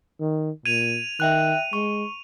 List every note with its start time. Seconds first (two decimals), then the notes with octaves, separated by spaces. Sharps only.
0.21 D#3
0.66 A#2 G#6 D#7 F7
1.20 D#3 E5 G5 F#6
1.73 G#3 C#6